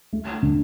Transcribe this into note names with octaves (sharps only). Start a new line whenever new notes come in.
A3
D3